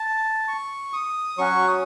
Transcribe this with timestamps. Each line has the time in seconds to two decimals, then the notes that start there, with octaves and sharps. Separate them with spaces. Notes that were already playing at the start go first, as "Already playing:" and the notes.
Already playing: A5
0.48 C#6
0.93 D#6
1.38 F#3 C#4 F#4 C#6
1.68 D#6